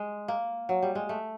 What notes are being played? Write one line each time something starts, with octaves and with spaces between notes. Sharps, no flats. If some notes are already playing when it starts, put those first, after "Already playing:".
Already playing: G#3
A#3
F#3
G3
G#3
A3